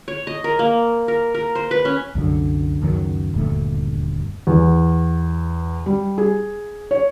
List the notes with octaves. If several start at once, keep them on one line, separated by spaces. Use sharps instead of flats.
C#5
D#5
A#4
A#3
A#4
A#4
C5
B4
C#4
C2 F#2 D3
C#2 F#2 D#3 F#3
D#1 D2 G2 A3
E2
G3
G#4
C#5